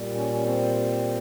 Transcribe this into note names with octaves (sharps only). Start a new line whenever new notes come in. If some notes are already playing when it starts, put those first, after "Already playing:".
Already playing: A#2 G3
C#4
C#4
C4